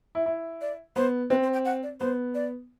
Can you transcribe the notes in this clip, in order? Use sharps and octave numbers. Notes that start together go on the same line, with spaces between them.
E4
E4
D5
B3 C5
C4 B4
C5
G5
F#5
D5
B3 C5
D5